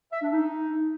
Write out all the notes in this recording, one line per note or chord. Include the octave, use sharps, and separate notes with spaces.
E5
D4
D#4